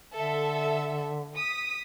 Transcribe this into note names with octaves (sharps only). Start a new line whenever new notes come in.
D3 A4 E5
D#6 B6